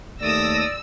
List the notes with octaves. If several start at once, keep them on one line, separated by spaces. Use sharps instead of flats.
D#2 A3 D5 D#6 E6 A#6